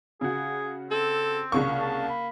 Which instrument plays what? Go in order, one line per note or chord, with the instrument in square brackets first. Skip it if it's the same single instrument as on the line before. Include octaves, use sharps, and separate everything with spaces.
[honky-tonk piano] C#3 F#4 [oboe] G#4
[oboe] C4 [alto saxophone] A4
[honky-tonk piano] C2 C#3 C#6 [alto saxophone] A#3
[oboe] A5
B5